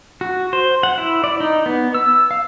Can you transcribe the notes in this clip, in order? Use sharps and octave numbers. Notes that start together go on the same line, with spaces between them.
F#4
C5
F#5
E4
D5
D#4
B3
E6
F5